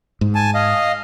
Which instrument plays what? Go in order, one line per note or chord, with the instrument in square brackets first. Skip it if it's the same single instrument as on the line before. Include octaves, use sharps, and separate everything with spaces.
[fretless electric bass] G#2
[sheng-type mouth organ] G#5 A5
D#5 F5